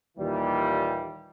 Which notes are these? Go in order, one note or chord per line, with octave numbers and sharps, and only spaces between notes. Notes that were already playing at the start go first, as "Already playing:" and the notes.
D#2 A#2 E3 G3